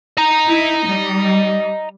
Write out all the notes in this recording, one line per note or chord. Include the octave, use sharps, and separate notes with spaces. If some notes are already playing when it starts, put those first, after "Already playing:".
D#5 A#5
E4
G3